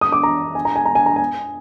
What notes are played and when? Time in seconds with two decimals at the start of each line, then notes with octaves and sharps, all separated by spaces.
0.01 D#6
0.12 D6
0.23 A#5
0.55 G#5
0.65 A#5
0.76 G#5
0.85 A#5
0.95 G#5
1.06 A#5
1.16 G#5